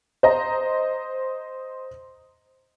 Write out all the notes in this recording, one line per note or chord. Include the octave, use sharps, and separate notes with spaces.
C5 D#5 A#5